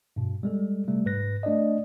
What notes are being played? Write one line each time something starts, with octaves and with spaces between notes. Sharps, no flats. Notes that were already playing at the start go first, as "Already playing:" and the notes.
G2 B2
G3 G#3 A4
C3 G3 A3
G#2 B4 F#6 A#6
A3 D4 D5 D#5